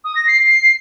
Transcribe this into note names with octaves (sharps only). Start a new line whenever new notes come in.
D#6
A#6
C7